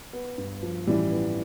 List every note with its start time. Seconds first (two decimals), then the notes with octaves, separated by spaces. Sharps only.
0.13 B3
0.38 G2
0.63 F3
0.87 A1 E3 G3
1.11 B3